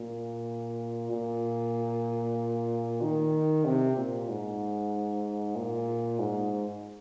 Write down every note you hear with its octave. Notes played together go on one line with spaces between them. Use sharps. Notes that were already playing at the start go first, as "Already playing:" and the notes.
Already playing: A#2
A#2
D#3
C3
A#2
G#2
A#2
G#2